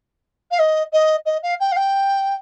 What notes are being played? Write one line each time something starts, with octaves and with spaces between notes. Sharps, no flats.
F5
D#5
D#5
D#5
F5
G5
F5
G5